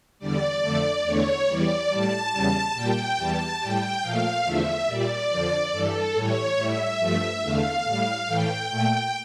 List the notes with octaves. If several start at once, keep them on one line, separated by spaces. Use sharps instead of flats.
E2 D3 G3 D5
F2 D3 A3
E2 D3 A3 C#5
E2 E3 G3 D5
A2 G3 A5
E2 C#3 G3
A#2 G3 G5
E2 E3 G3 A5
A2 G3 G5
A#2 F3 A3 F5
E2 D3 F3 A3 E5
A#2 G3 D5
F2 D3 F3
G2 E3 G3 A4
A2 E3 G3 C#5
A2 G3 E5
G2 F3 A3
E2 D3 A3 F5
A2 G3
A2 E3 A3 G5
A#2 A3